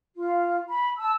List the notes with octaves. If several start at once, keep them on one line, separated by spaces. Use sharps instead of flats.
F4
B5
A5 E6